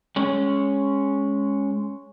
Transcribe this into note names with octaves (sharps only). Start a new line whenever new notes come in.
G#3 C#4